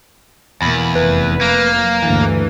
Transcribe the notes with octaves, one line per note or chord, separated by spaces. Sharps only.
E2 B2 A#3 B5
F1 B4
A#3
F#3
D2 G2 D3 E3